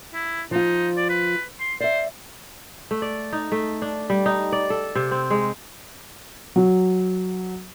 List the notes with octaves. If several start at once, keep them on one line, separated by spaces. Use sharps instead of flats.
E4
F3 D#4 F4
D5
B4
C6
C5 D5 E5
A3
D5
D#4
A3
D4
G3
D#4
D5
A4
C3
C4
G#3
F#3